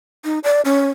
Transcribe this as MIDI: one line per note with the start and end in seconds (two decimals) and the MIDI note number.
0.24 0.39 63
0.44 0.61 74
0.65 0.90 61